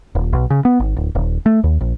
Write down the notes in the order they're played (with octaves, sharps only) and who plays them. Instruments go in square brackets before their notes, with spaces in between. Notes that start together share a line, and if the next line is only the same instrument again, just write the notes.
[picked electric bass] D#1
B1
C#3
B3
G#1
D1
D#1
A3
D#2
A#1